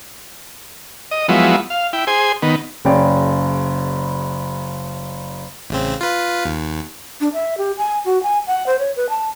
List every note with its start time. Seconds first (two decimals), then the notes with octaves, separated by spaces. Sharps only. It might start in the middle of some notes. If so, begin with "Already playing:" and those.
1.11 D#5
1.28 F3 F#3 G#3 B3 E4
1.70 F5
1.93 E4 G5
2.07 G#4 C5 G#5
2.42 D#3 B3
2.85 F#1 C#3 C#5 D5 G5
5.70 A1 C#3 C4
6.01 F4 B4
6.45 D#2
7.21 D4
7.33 E5
7.58 G4
7.77 G#5
8.05 F#4
8.23 G#5
8.47 F#5
8.66 C5
8.79 C#5
8.96 B4
9.09 A5